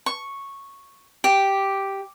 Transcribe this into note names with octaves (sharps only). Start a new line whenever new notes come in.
C#6
G4